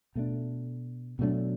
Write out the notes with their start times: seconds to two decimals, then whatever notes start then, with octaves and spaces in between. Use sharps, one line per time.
0.15 B2 A3 D4
1.19 B2 F#3 A3 D4